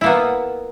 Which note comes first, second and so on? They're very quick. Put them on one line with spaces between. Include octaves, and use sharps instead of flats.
E4 A#3 B3